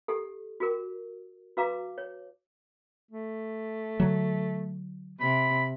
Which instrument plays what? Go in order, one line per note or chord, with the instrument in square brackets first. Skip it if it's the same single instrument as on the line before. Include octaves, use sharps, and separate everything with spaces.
[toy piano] G4 A4
F#4 G#4 A#4
F#4 B4 F5 A#5 D6
C#5
[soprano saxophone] A3
[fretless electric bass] D3 F#3
[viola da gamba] C3 [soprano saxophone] B5